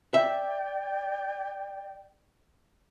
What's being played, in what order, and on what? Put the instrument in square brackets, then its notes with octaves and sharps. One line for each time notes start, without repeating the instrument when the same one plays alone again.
[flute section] D5 G5 [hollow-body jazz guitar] E5